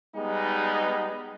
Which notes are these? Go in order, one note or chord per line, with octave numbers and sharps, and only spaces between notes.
G3 G#3 B3 D#4